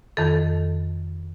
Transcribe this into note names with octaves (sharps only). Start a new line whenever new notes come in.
F2 D#3 A4